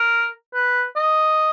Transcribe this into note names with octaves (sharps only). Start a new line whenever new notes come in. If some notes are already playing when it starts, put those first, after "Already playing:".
Already playing: A#4
B4
D#5